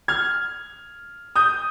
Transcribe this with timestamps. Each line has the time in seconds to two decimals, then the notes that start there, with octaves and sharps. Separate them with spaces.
0.08 F6 G#6
1.36 D#6 G6